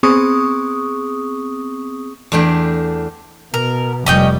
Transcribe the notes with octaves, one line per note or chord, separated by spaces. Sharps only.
B3 C4 G#4 C#6 D#6
E2 A3 D4 G5
B2 A#4
F1 G3 C#4 D#5 G5